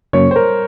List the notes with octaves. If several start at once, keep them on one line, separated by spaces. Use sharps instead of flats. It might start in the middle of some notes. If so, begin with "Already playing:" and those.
F#2 C#3 F#3 A#3 C#4 C#5
C5
A#4